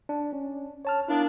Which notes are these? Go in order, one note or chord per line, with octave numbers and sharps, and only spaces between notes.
D4
C#4
C#5 A5 F6
A#3 B3 D4 E4